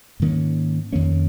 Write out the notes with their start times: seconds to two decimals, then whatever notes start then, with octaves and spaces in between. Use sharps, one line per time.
0.20 G#2 D#3 A#3 C#4
0.92 F2 D#3 A#3 C#4